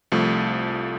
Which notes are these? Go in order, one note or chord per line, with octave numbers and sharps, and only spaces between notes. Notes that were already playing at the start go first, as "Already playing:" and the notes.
C2 F3 A3